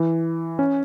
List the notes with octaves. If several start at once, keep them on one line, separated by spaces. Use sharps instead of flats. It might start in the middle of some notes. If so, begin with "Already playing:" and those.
Already playing: E3
C#4